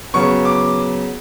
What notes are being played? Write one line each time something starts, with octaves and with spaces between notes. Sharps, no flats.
C#3 F#3 B3 C#6
D6